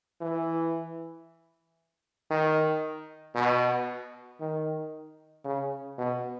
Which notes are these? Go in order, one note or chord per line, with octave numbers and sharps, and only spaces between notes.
E3
D#3
B2
D#3
C#3
B2